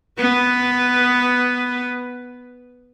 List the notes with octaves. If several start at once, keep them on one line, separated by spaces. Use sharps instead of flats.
B3 B4